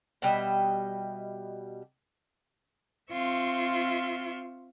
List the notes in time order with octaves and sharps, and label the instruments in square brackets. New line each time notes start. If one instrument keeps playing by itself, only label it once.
[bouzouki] B2 G3 D#5 E5
[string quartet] C4 F4 E5 C6 C#6